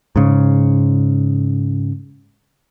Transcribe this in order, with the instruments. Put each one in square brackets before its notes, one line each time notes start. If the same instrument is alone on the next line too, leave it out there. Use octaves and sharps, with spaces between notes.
[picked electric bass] G#2 C#3